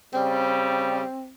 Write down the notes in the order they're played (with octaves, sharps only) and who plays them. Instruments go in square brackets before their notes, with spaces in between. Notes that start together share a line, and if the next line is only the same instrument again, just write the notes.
[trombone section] C#3 G3 [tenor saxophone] C4